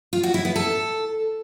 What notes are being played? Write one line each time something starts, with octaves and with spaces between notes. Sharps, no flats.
F4
F#4
E4
B3
A4